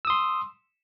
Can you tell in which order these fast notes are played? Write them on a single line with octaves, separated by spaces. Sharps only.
E6 D#6 C6